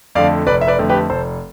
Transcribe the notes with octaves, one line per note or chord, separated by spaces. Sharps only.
F2 D3 A3 D5 F5
F1 B4 D5
E5
B4 D5
F2 D3 A3
G4 B4
F1 A4 C5